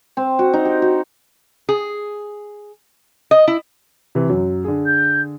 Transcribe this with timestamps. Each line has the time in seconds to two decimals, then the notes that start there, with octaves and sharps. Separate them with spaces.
0.17 C4
0.39 F#4
0.53 D#4
0.65 G4
0.82 F#4
1.69 G#4
3.31 D#5
3.48 E4
4.15 C3 E3
4.29 F#2 F#3
4.64 D3 G#4
4.86 G6